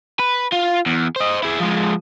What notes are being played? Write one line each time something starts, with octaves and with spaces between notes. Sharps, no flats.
B4
F4
E2
C5 D#5
E4 G#4
F3 G#3